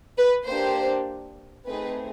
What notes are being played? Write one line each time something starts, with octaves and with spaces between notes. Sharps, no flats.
B4
A#3 D4 G4 C5
A3 C4 D#4 G#4 B4